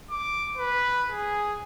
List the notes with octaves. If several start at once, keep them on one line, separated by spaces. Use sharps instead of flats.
D6
B4
G#4